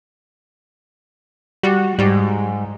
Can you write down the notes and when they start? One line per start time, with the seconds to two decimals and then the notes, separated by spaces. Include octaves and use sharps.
1.63 G3 F#4
1.99 G#2 G3